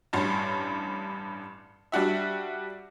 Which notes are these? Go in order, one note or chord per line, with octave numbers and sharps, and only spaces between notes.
A1 G2
G3 D4 F#4 E5